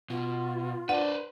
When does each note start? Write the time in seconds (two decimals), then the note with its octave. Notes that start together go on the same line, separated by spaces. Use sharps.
0.10 B2 F4
0.89 D4 B4 C5 F#5